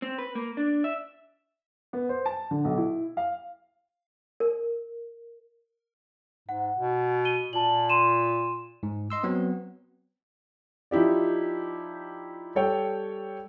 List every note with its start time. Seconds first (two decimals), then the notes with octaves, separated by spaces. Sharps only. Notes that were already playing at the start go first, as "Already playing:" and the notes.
0.02 C4
0.18 B4
0.35 A#3
0.57 D4
0.84 E5
1.93 B3
2.09 C5
2.26 A5
2.51 D3
2.65 B1
2.77 E4
3.17 F5
4.40 A#4
6.49 G#2 F#5
6.77 B2
7.25 D#7 G7
7.53 A#2 A5 F#7
7.89 C6 D#7 E7
8.83 G#2
9.10 D#5 C6 E6
9.23 F#3 B3 C4
10.91 F3 D#4 E4 G4 D5
12.55 G3 A4 C#5 G5